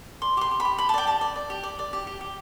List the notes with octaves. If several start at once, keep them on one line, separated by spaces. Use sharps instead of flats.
D5 C6
G4 C6 D6
G4
B5
G4
G4 B5
A5
D5 G5
G4 A5
D5
D5
G4
D5
D5
G4
G4
G4